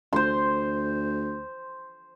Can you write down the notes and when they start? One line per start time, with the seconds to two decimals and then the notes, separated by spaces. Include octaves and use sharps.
0.13 D2 C5 C6